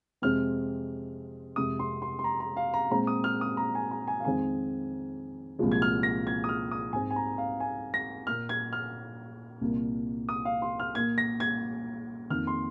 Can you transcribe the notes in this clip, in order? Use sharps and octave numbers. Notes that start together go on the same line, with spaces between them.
F2 C3 G#3 C4 F6
F2 C3 G#3 D#6
C6
C6
C6
A#5
A#5
F5
A#5
A#2 G#3 C4 A#5
D#6
F6
D#6
A#5
G#5
A#5
G#5
F5
F2 D#3 G#3 C4 G#5
C2 A#2 F3 G#3
G#6
F6
A#6
G#6
D#6
F6
D#6
G#2 G#3 C4 G#5
G#5
A#5
F5
G#5
A#6
A#2 A#3 F6
G#6
F6
C2 A#2 A#3
D#6
F5
C6
F6
A#2 A#3 G#6
A#6
G#6
F2 D#3 A#3 F6
C6